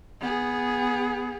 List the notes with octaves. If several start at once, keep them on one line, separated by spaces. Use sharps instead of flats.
B3 G#4